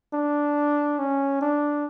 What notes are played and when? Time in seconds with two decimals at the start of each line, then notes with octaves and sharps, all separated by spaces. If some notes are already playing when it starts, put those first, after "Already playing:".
0.14 D4
0.99 C#4
1.41 D4